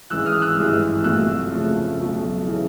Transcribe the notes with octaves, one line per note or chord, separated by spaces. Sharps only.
G#1 G#2 E3 E6 F#6
D#6 F6
E6 F#6
G#1 G2 E3 G#3
C2 A#2 F#3 A3 E6 F#6
F2 C#3 F3 A3
B1 B2 F#3 A3
C#3 E3